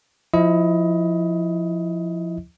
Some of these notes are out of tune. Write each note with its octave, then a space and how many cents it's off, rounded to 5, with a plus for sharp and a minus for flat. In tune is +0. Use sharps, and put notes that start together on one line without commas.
F3 +0 E4 +0 D#5 +20